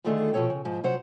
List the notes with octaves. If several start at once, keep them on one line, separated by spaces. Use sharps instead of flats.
D2 D3 D#3 A3 F4 G#4
B2 F3 G#3 A4 C#5 G5
C#3
G#2 F3
C3 F#3 C5 F#5